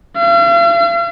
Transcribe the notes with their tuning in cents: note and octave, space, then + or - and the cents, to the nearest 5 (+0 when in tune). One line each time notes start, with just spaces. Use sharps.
F5 -45